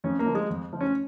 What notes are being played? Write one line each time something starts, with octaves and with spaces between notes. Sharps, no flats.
F2 C#4
A#3
F3
G#3
F2
F3
C#4